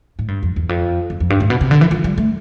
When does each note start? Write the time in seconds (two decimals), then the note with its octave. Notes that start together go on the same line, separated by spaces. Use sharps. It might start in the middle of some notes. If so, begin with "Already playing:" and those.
0.19 A2
0.28 G2
0.43 F2
0.56 E2
0.69 F2
1.10 F2
1.20 F2
1.30 G2
1.40 A2
1.50 B2
1.61 C3
1.71 D3
1.81 E3
1.91 F3
2.04 G3
2.18 A3